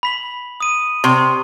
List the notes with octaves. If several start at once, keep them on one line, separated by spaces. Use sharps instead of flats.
B5 B6 F#7
D#6 D#7
C3 C#6